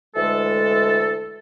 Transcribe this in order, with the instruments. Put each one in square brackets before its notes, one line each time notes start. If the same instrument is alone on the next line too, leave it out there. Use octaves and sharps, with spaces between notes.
[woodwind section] D2 E3 G#3 A4